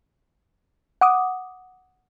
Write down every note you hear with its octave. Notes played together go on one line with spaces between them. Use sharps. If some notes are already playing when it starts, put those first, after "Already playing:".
F#5 D6 D#6